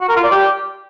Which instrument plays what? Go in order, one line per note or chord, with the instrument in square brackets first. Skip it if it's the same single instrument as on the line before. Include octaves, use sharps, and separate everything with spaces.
[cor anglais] F#4
A#4
F4
D5
G4